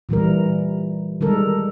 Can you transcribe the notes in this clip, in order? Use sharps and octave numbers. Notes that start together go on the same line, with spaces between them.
A#2 E3 G3 A#4
D#3 G3 G#3 A4 A#4